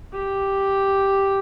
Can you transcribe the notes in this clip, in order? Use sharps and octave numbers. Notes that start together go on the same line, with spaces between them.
G4